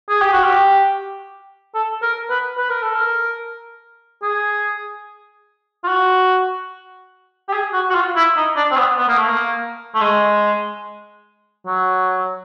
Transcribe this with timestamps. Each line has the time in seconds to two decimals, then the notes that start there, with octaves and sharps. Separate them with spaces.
0.09 G#4
0.22 G4
0.33 F#4
0.44 G4
1.75 A4
2.03 A#4
2.30 B4
2.58 B4
2.70 A#4
2.83 A4
2.95 A#4
4.23 G#4
5.84 F4
5.88 F#4
7.48 G4
7.53 G#4
7.73 F#4
7.90 F#4
7.95 F4
8.16 E4
8.37 D#4
8.56 D4
8.71 C4
8.77 B3
8.98 B3
9.08 A#3
9.18 A3
9.29 A#3
9.95 A3
10.01 G#3
11.67 F#3